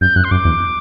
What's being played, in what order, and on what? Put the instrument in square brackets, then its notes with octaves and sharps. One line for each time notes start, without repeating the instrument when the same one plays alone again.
[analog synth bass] F#2 [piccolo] G6
[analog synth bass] F#2 [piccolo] F#6
[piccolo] C6
[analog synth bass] F#2 [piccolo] D6
[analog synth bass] E2